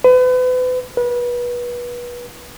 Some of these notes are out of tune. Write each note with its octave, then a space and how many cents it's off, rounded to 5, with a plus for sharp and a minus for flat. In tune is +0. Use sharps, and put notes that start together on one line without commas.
B4 +35
B4 -30